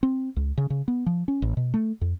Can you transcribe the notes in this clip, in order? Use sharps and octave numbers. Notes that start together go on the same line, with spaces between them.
C4
C#2
C#3
C#3
B3
F3
C#4
A1
B2
A3
F2